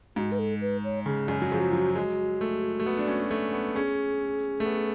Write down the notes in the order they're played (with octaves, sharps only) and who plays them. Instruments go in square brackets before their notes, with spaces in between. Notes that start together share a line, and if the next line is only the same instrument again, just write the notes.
[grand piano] G#2 [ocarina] F#4
[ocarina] B4
A4
B4
C#5
[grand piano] C#3 [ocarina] G#4
[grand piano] F#2
F#3
[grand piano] F3 [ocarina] G#4
[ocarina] F#4
[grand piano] F#3 [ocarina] F4
[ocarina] F#4
[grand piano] G#3 [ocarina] F#4
[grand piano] A3
A3
B3
D4
C#4
A3
B3
[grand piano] C#4 [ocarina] G#4
[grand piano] A3
B3